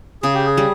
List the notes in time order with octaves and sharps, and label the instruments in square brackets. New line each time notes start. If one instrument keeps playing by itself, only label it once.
[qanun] C#3 [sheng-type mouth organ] G#4
[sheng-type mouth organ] G4
G#4
[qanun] G3